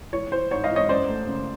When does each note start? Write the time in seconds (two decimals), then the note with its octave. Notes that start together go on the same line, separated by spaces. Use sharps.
0.13 E3 C#5
0.32 E3 C5
0.51 G#2 C#5
0.64 D#5 F5
0.70 E3
0.76 C#5 D#5
0.89 F#2 C5 D5
1.08 A3
1.27 C#3